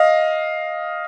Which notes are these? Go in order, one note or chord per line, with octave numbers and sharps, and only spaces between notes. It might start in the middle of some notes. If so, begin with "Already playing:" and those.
Already playing: D#5 F5